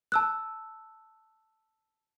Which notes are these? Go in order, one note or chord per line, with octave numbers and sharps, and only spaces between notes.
A5 E6 F#6